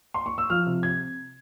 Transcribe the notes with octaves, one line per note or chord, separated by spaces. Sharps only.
C6
C#6
E6
F3 F6
C3
G#6